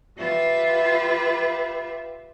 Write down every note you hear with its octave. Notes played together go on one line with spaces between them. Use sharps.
F4 G4 B4 E5